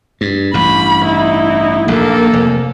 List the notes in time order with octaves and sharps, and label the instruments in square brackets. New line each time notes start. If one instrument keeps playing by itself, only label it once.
[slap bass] G2
[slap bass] A1 G2 [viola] B5
[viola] D#4 E4
[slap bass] A#1 D#2 [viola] A#3 A4
[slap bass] F1